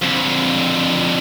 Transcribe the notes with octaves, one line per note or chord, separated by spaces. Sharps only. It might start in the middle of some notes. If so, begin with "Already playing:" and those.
F2 D3